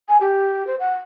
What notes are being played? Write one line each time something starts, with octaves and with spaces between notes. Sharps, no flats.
G#5
G4
C5
F#5